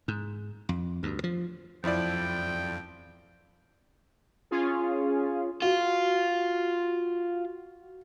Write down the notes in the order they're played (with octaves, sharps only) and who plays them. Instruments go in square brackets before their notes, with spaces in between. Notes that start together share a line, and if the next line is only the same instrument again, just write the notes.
[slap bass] G#2
F2
D2 G2
F3
[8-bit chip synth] F2 [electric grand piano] F3 E4 D5 [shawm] G5
[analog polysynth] C#4 F4 G#4
[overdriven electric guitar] F4 [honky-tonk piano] F#4